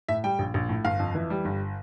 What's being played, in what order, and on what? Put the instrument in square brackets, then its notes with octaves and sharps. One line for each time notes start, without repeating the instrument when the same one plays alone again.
[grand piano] A2 E5
G3 G5
A#1
A#1
A2
G1 F5
F2
E3
G3
G1